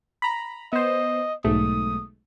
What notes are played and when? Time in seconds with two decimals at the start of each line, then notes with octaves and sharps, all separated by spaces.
0.22 A#5 B5
0.73 B3 C5 D#5
1.44 B1 G#2 A3 D#6